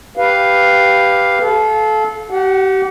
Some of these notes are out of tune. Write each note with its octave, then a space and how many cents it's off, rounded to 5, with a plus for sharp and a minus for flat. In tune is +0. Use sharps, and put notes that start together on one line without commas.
G4 +0 B4 +0 F5 +0
A4 -30 F5 +0
G4 -35 F#5 +0